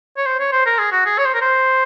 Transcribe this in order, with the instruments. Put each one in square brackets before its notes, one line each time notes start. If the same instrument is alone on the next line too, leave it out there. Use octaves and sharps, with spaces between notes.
[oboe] C#5
C5
C#5
C5
A#4
G#4
F#4
G#4
C#5
C5
A#4
C5